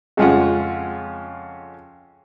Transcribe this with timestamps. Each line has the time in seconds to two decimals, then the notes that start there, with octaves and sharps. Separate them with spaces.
0.17 F2 C#3 G#3 C#4 F4 F#5